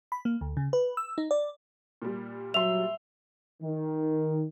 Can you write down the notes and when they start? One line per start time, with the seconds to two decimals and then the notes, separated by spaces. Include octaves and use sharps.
0.12 B5
0.25 A#3
0.41 D2
0.57 C#3
0.73 B4
0.97 E6
1.18 D#4
1.31 D5
2.02 A#2 G3
2.54 F#3 E5 C6 F7
3.63 D#3